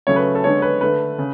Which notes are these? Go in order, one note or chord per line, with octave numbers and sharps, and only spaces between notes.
C#3 F#3 A3 C#5
B4
A4
D3 G#3 B3 C#5
B4
D3 A3 B4
C#3